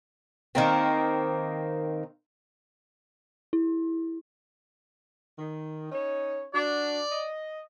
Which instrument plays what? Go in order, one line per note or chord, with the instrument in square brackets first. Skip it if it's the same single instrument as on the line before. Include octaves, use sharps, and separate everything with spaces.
[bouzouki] D#3 A#3 C4
[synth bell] E4
[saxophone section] D#3
C#4 D#4 C#5
[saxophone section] D4 F#4 [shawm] D5
[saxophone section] D#5